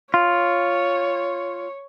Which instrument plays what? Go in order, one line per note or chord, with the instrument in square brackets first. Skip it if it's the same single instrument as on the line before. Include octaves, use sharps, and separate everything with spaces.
[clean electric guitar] F4 [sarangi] C#5